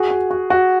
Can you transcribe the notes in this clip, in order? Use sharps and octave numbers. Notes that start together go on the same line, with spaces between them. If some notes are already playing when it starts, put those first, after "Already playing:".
Already playing: F#4 G#4
F#4
F#4
F#4